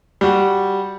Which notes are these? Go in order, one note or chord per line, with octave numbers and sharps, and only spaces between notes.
G3 F#4